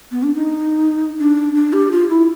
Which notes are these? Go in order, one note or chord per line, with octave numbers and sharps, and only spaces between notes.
B3
D4
D#4
D4
D4
G4
F4
E4